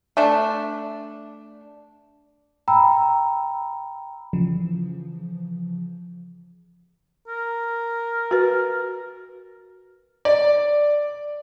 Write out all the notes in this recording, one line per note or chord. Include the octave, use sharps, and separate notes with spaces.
A3 D4
G5 A#5 B5 E6
C#3 E3 F3
A#4
F#4 B4
D5